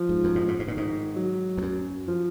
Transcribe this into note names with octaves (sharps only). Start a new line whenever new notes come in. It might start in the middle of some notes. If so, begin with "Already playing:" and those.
Already playing: F3
G#2
F#2
G#2
G#2
G#2
A#2 D#3
G#2
F#3
F2
F#2
F3